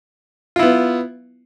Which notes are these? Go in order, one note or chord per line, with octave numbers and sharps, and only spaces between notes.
B3 E4 F4